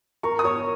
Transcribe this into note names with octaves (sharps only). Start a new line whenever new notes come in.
A#4 C#6
D#6
C#5 C#6